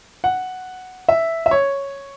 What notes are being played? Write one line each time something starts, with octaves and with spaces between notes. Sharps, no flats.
F#5
E5
E5
C#5